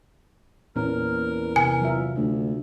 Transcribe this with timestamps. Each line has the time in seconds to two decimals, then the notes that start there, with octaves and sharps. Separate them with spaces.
0.76 E2 A#2 C#4 A#4
1.56 C3 G#5
1.81 F#3 F4 E5
2.16 D2 G#3